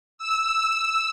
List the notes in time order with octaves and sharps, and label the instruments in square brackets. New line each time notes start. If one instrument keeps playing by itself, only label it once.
[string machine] E6